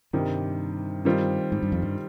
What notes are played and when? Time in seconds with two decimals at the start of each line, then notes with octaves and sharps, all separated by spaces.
0.13 G2 C3 D#3 G3
1.05 D#3 G3 C4 F4
1.52 G#2
1.63 G2
1.72 F2
1.82 G2